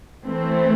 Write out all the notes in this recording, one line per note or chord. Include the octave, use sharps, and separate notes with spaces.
E3 A3 C4